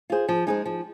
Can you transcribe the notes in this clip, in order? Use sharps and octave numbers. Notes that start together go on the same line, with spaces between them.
F4 G#4 C5
F3
G#3 D#4 G#4 C5
F3